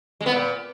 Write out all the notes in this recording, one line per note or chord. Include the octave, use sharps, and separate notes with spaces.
G#3
B3
A#2